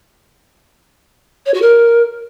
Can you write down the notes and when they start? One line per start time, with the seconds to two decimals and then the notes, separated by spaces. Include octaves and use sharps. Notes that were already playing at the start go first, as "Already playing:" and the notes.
1.46 C#5
1.54 F#4
1.62 A#4